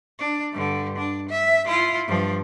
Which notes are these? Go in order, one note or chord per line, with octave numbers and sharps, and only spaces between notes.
D4
G2 D3
D4
E5
E4 F4
G2 F3